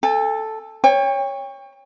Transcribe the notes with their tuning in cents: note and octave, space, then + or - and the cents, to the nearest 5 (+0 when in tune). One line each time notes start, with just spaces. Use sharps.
A4 +0 G#5 -45
C#5 +0 G5 +35